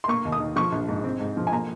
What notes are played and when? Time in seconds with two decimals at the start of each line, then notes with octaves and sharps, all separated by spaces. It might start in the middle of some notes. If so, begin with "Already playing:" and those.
0.04 C6
0.08 A#3 C#6
0.25 D#2
0.32 D#6
0.40 D#3
0.56 F3 C#6
0.72 A#1
0.89 G#2
1.04 C4
1.20 G#2
1.37 F3
1.47 G#5
1.52 A#3 A#5